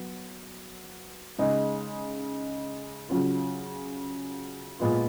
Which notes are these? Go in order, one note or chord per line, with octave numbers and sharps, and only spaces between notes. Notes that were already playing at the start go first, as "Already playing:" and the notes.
Already playing: F#3 B3
C#3 G#3 D#4
C#3 F#3 C#4 F4
A#2 G#3 B3 F4